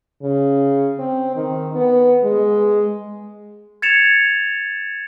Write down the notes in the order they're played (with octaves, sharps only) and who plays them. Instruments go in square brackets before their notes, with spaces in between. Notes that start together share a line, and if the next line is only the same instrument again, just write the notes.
[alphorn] C#3
C4
D#3
B3
G#3
[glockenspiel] G#6 A6 C#7 E7 F7